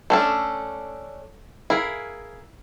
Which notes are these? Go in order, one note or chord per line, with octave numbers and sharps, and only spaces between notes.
A3 C#4 D4 A4
E4 G#4 A#4 F5